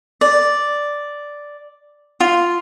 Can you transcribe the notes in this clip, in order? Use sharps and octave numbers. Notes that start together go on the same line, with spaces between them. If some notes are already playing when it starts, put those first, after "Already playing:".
D5
F4